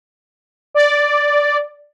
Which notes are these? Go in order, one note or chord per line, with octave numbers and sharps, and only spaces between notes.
D5